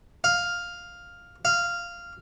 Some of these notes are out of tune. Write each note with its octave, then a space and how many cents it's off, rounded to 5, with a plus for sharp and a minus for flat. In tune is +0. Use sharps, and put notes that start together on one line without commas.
F5 +5
F5 -10